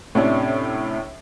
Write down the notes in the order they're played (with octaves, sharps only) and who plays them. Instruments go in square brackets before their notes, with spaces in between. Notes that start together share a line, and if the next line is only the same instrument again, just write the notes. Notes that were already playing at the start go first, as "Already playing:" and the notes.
[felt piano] A2 C3 C#4 D4